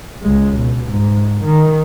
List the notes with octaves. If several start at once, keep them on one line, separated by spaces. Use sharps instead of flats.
C#2 G#3
B2
G#2
D#3